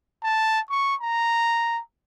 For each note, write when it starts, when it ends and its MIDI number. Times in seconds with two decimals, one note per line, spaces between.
0.23 0.61 81
0.70 0.96 85
1.01 1.80 82